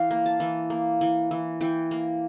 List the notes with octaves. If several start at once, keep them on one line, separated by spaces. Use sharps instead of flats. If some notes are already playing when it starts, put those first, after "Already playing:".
Already playing: E3 F5 G5
A#3
A5
E3
A#3
E3
E3
E3 G5
A#3